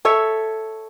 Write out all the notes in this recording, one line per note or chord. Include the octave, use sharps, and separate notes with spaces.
A4 C#5 E5